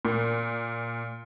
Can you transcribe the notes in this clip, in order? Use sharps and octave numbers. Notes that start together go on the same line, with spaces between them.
A#2